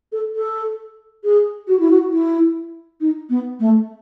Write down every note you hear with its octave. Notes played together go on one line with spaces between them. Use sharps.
A4
A4
G#4
F#4
E4
F#4
E4
D#4
B3
A3